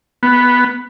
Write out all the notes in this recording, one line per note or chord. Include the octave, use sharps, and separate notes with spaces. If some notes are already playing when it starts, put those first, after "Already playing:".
B3